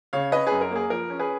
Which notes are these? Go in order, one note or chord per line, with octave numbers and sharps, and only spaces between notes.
C#3 C#5 F5
C#4 B4 D#5
F#2 G#4 B4
A#4
A#3 G#4
F3 A#4
C#4
G#4 B4